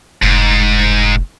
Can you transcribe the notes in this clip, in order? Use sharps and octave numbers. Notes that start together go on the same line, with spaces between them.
F1 G#2